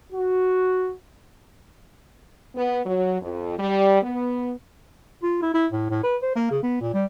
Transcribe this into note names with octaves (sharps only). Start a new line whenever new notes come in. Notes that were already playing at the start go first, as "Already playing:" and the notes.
F#4
B3
F#3
F2
G3
B3
F4
E4
E4
A2
A2
B4
C5
A#3
C#3
B3
A#2
G3